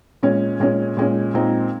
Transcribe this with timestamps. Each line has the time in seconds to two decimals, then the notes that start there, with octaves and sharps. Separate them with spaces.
0.23 A#2 G#3 C#4
0.60 A#2 G#3 C#4
0.97 A#2 G#3 C#4
1.34 A#2 G#3 C4 D#4